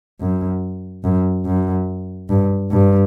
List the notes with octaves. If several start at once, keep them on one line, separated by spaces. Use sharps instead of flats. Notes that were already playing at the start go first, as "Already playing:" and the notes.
F#2
F#2
F#2
G2
G2